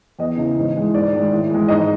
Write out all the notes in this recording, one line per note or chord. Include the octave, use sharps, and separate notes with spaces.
E2 D#5
C#3 E3
G#2
E3 G#3
G#2 D5
D#3 G#3
A2
E3 G#3
G#2 D#5